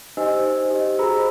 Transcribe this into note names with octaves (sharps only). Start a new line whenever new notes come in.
D#4 G4 C5 D#5 G#5 E6
C5
G4 D#5
F#4 G#4 C5 A#5 B5 E6